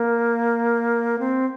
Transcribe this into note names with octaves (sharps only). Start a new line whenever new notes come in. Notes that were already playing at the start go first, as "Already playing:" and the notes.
Already playing: A#3
C4